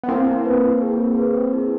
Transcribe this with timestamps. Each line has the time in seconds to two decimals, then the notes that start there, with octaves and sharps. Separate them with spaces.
0.04 B3
0.09 A#3 C4 E4
0.27 E4
0.46 B4
0.63 E4
0.82 G#4
0.99 G#4
1.17 B4
1.36 G#4
1.53 E4